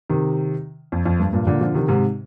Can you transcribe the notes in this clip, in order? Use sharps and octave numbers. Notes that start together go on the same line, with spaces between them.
C3 D#3
F2
F2
G2
G2 A#2
A#2 D3
D3 F3
C3 D#3
G#2 C3